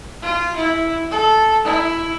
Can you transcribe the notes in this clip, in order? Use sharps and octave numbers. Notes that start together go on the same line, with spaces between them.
F4
E4
A4
E4